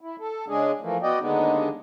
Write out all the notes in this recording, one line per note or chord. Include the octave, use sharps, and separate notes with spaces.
E4
A4
C#3 G#3 D4 G#4
E3 F3 A3 A#3
B3 F#4 D5 D#5 G5
D#2 D3 G#3 B3 D4 D#4